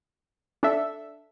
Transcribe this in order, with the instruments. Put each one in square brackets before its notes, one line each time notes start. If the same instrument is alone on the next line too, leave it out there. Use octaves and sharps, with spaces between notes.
[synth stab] D4 A4 E5